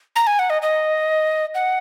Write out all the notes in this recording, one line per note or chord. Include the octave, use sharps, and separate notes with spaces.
A#5
G#5
F#5
D#5
D#5
F#5